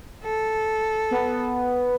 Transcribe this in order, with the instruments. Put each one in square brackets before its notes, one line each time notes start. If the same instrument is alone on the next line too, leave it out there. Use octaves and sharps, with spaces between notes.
[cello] A4
[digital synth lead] B3